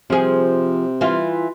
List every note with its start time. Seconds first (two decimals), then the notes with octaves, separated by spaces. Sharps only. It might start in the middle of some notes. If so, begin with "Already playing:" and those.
0.10 C3 F3 G#4
1.01 E3 F4